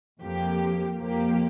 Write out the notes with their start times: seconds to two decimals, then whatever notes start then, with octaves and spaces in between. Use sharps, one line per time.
0.21 F2 F3 A#3 G4
0.98 F2 F3 A#3 G4